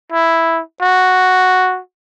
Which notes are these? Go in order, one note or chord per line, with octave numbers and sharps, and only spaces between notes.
E4
F#4